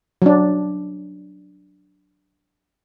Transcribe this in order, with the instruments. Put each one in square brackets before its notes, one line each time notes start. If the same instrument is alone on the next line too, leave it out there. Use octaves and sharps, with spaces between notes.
[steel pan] F#3 D4